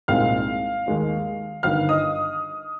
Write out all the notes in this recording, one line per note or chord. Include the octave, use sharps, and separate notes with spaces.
C2 A#2 G#3 C4 D#4 F5 F6
D#2 D#3 G#3 D#4
G1 G2 D#3 F5 F6
D#5 D#6